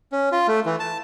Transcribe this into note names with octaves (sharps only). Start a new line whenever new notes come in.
C#4
F4
A3
E3
A5